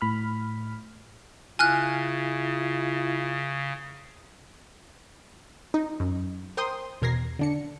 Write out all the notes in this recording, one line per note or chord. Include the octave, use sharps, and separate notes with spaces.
A2 B5 F6
C#3 E4 F4 G#5 F6 F#6
D#4
F#2
A#4 C5 G5 C6 D#6
E2 B2 A#4 G#6 A#6 C7
D3 D4 C#7